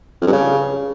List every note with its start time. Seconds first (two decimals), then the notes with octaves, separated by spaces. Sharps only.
0.21 F2
0.27 G2
0.32 C#3